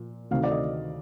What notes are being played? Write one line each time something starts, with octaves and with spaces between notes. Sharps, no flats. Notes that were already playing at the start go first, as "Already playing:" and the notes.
Already playing: A#2 F3
D2 C3 D#3 A3 F5
D5
D#5